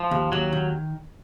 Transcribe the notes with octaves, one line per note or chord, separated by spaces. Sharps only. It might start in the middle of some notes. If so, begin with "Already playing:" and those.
Already playing: F3
D#2
D#2 F#3
D#3